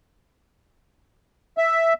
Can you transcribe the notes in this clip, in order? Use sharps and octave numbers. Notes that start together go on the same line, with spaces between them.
E5